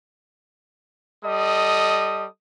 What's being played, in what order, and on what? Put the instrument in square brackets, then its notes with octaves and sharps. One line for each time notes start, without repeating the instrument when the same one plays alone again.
[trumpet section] G3 A4 D#5 D#6